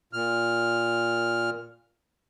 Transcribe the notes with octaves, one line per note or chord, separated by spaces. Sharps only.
A#2 F6